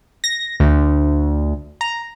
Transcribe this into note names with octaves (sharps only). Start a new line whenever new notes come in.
A#6
D2
A#5